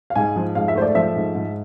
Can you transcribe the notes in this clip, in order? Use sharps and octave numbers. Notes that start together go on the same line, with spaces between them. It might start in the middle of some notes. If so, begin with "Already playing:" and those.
F5
G#2 G#5
F3
G#2 F5
E5
A3 C5
D5
F3 E5
G#2
G#2